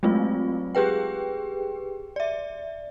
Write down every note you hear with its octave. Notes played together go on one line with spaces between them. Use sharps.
F#3 G#3 A3 C4 F4
G4 G#4 B4 G5
D5 E5